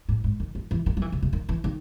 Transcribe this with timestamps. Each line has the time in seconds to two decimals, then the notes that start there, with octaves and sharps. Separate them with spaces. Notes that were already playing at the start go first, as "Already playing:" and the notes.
0.09 A2
0.24 G#2
0.40 D#3
0.55 D#3
0.71 E3
0.86 D#3
0.97 F#3
1.02 E3
1.12 C#3
1.23 C3
1.33 D#3
1.49 E3
1.64 D#3